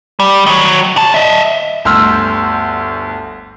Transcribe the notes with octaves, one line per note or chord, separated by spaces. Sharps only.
G3
D#3 F#3
C3 A5
D#5 E5
G1 D2 C6 E6 F6